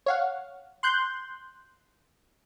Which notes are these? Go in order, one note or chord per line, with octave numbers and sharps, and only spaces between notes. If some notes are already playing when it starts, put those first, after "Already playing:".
C#5 F5 F#5
C6 F#6 G6